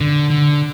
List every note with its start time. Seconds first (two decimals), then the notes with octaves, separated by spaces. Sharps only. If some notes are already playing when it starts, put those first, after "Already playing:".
0.01 D3
0.30 D3